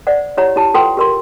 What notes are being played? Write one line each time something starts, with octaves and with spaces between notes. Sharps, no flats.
C5 D5 F#5
E4 G4 C#5 F#5 A#5
E4 G4 A5
F4 A4 B4 F#5 G5 C6
G4 A#4 C6